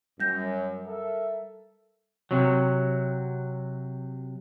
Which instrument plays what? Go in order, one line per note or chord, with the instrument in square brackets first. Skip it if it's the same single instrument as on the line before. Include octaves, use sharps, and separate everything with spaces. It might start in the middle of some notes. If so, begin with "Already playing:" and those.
[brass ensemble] F#2 [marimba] G3 G6 A#6
[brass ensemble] A4 A#4 E5
[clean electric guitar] C3 F#3